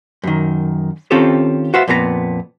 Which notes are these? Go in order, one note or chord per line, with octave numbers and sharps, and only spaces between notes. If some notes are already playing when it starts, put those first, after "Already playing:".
F#2 D#3
D#3 C4 C#4 F4 G4 A4
F#4 B4 C5 E5 F5
F2 A#2 B3 A4 A#5